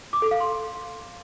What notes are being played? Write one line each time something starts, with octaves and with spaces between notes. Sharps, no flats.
D6
A4
F5
C6